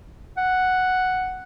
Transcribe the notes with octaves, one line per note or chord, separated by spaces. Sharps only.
F#5